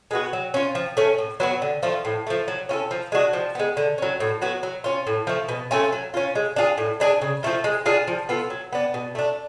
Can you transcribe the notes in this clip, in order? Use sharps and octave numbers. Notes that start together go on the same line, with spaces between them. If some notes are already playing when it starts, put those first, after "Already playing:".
G#3 B3 F#4
F#3
C#4 F4
F3
A3 C#4
A2
F#3 B3 F#4
D3
F3 A3 F4
A2
F3 A3
F#3
C#4 F4 A4
F3
G#3 D4 F#4
F3
G#3 B3
D3
F#3 C#4
A2
F#3 B3 F#4
F#3
C#4 F4
A2
F3 A3
B2
A3 C#4 F4
F#3
C#4 F4
G#3
D4 F4 G#4
A2
G#3 D4 G#4
C#3
F3 A3 F4
G#3
D4 F4 G#4
F3
B3 F4 A4
F#3
B3 D4
B2
A3 D4